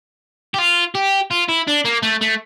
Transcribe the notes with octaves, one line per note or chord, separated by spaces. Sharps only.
G4
F4
G4
F4
E4
D4
A#3
A3
A3